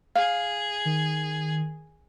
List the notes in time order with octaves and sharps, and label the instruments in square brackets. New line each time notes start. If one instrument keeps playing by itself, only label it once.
[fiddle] G#4 [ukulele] F5
[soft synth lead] D#3